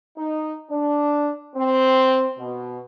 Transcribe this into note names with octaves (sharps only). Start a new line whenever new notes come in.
D#4
D4
C4
B2